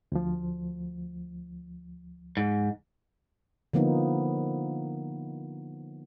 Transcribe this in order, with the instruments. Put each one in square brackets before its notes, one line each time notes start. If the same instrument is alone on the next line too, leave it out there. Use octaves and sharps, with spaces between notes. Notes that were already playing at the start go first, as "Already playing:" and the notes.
[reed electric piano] D2 F3
[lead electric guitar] G#2
[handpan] D3 F3 A#3 B3 D#4